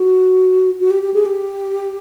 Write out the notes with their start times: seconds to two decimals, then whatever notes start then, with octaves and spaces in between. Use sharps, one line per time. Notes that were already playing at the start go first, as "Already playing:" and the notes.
Already playing: F#4
0.80 F#4
0.91 G4
1.03 G4
1.14 G#4
1.26 G4